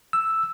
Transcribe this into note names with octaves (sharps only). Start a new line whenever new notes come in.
E6